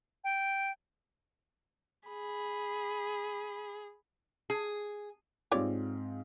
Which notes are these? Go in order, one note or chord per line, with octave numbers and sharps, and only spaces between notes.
G5
G#4 B5
G#4
G#2 C4 F4 G4 C#5 D5